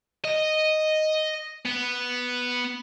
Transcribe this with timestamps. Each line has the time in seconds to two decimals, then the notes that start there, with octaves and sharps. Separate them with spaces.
0.25 D#5
1.66 B3